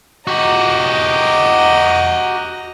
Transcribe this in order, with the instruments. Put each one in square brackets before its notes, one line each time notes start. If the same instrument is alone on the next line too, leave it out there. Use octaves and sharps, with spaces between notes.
[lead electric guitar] F#4 G4 [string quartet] D#5 A#5